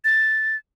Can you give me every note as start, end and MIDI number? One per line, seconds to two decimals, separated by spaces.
0.05 0.56 93